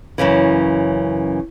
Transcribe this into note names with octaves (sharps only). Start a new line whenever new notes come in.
F#2 A#2 C#3 E3